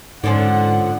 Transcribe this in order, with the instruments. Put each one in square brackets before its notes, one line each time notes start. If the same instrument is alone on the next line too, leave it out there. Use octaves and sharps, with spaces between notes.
[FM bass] G#2 [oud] D3 F3 C#4 [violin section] F#5